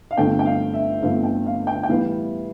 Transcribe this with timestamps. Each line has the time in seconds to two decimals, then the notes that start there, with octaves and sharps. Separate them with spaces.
0.11 F5
0.17 G1 G2 D3 A3 C4 G5
0.39 G5
0.45 F5
0.74 E5
1.02 G1 G2 D3 A3 C4 F5
1.24 G5
1.46 F5
1.67 G5
1.83 G5
1.89 A2 E3 G3 B3 E4 F5